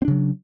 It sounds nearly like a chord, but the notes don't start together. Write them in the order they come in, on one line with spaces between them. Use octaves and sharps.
C4 D4 C#3 F#3